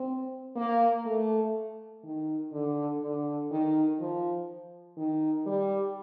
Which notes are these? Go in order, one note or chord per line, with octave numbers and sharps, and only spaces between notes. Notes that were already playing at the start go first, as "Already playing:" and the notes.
Already playing: C4
A#3
A3
D#3
D3
D3
D#3
F3
D#3
G3